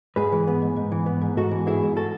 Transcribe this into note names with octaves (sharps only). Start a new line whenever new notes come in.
G#2 G#4 B4
E3
B3
G#2
G#2
E3
B3
G#2
G#2 F#4 A4
E3
B3 E4 G#4
G#2
F#4 A4